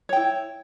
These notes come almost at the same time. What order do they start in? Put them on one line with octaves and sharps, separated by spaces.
C#5 G5 E4